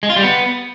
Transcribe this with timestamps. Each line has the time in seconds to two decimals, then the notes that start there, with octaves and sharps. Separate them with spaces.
0.03 G#3
0.10 F4
0.16 G3
0.23 B3